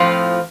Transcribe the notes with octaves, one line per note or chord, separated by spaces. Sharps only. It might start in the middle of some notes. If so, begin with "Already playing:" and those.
Already playing: A2 F3 C4 F4